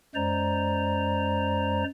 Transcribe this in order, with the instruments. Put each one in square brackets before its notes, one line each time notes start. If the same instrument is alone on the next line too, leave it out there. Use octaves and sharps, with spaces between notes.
[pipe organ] F#2 G#3 C5 D5 A#5